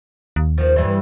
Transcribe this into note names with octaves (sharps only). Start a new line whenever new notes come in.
D#2
D#3 F3
G2 E3